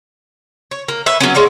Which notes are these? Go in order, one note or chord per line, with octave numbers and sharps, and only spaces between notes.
C#5
A#3
B4 C#5 E5
F#3 B3 C#4
G#3 C#5 D5 F5